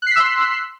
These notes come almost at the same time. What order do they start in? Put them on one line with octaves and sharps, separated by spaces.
F#6 C7 B6 E6 C6